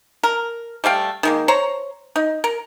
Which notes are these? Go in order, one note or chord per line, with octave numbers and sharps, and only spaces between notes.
A#4
G3 A3 F5 G5
D#3 G#3 A#3
C5 C#5 A#5
D#4
A#4